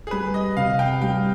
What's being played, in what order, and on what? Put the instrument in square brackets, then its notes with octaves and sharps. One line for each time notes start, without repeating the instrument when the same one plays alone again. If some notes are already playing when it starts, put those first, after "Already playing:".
[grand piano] G#4
[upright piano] G3 [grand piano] B4
[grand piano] D#5
[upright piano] C3 [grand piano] F5
[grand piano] G5
[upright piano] G3 [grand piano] G5